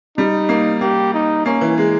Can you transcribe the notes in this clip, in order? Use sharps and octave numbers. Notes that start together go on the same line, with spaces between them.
G3 D#4
A#3
A#3 G4
D#4
A#3 C#4
E3
G#3